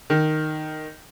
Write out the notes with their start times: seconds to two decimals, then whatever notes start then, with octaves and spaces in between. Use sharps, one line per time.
0.10 D#3